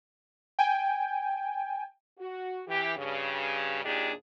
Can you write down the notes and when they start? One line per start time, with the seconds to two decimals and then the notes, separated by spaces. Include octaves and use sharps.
0.59 G5 G#5
2.19 F#4
2.68 E3 G4
2.97 G2 C#3
3.84 D#2 A#2 D4 D#4 G4 G#4